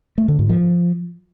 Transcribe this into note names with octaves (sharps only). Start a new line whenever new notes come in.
A3
D3
G#2
F3